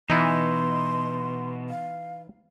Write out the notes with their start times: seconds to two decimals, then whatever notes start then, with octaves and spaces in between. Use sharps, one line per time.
0.10 B2 E3 D#4 E4 C6
1.70 F5